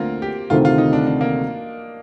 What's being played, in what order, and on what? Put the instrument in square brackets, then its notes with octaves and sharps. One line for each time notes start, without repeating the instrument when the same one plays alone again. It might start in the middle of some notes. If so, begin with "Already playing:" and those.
Already playing: [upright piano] D2 D3 A3 [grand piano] A#3 C4 F4
[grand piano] G4
[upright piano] D2 C3 D#3 A3 C4 [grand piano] F4
[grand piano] F4
D#4
D4
D4
A#3